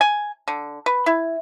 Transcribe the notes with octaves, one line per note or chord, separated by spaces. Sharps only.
G#5
D3
B4
E4